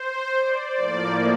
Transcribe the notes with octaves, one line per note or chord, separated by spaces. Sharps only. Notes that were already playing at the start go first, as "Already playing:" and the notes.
Already playing: C5
D5
A2 F3 A#3